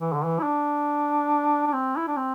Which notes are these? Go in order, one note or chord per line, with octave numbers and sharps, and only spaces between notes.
E3
D3
E3
E4
D4
D4
C4
E4
D4
C4